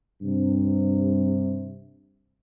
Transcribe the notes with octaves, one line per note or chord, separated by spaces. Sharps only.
G2 C3